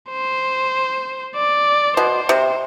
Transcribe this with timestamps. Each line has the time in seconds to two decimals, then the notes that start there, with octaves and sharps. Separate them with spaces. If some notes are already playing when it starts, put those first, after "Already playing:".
0.11 C5
1.36 D5
1.97 B2 C5
2.29 C3